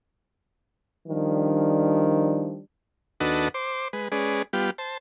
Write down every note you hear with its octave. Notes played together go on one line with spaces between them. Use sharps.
D#3 F3 G3 D4
D#2 D4 F#4 A4 B4 D#5
C5 D6
G#3 B4
G#3 C#4 G#4 B4 D5
G3 B3 F4 G4
C5 A5